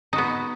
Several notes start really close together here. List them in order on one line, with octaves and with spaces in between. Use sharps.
D#4 F#4 B3